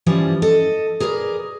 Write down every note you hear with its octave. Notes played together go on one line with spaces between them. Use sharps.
E3 F3 G3 C#4
A4 D#5
G#4 A#4 B4 C#5 D5